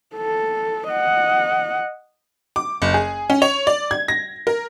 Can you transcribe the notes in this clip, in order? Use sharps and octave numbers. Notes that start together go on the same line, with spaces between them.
A4
D#5 F#5
D6
F#1
G#4
C#4
C#5
D5
G#6
A#6
A#4